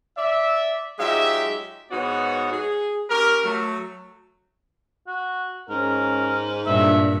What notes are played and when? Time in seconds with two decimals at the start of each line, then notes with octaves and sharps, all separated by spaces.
0.17 D5 E5
0.99 F#3 G#3 D#4 F4 G4 E5
1.91 G#2 B3 D#4 F#4 C#5
2.52 G#4
3.09 C#4 G4 A#4
3.44 F#3 A3
5.07 F#4
5.70 G#2 C#4 A#4
6.66 G2 A#2 D4 E5